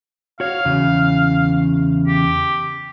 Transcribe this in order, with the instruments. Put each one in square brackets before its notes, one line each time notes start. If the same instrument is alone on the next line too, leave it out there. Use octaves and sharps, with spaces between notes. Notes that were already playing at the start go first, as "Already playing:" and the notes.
[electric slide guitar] F#4 C#5 [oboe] F5
[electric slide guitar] E2 C#3
[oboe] G4